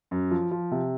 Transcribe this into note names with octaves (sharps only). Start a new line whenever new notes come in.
F#2
F3
F3
C3